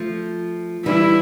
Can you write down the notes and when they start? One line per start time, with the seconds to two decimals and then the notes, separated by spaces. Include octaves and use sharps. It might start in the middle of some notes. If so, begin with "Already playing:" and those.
Already playing: F3 A3
0.86 E3 G3 E4